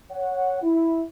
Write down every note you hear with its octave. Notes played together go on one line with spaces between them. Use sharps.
C#5 F#5
E4